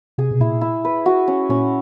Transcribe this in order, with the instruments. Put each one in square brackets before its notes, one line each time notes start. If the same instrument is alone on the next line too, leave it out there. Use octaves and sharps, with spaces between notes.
[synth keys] C3 [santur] G#4
[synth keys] B2
[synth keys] A#2 [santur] E4
[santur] E4
B4
F#4
C#4
[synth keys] A#2 [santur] C#4